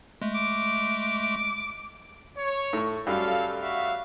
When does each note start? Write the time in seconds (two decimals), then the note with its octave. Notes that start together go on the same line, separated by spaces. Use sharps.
0.22 G#3 A3
0.35 D6
2.37 C#5
2.73 A2 C#6
3.06 F#2 G3 A3 A4 F5
3.60 F#4 E5 F5